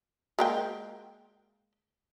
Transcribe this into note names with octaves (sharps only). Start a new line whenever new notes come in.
G#3 A#3 G5